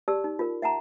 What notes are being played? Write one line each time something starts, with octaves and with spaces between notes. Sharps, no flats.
G4 D5 A5 E6
D#4
F4 A#4
E5 F#5 A5 A#5